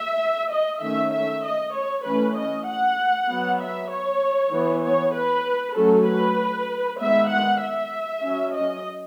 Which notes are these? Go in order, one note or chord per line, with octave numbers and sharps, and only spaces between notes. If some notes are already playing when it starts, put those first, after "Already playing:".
Already playing: E5
D#5
D#3 A3 C#4 E5
E5
D#5
C#5
E3 A3 C#4 B4
D#5
F#5
F#3 B3
E5
C#5
E3 B3
C#5
B4
F#3 A3 C#4 A4
B4
D#3 G#3 B3 E5
F#5
E5
F#3 C#4
D#5